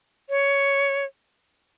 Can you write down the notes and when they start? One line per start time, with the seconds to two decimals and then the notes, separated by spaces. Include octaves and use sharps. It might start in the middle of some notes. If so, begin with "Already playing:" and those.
0.30 C#5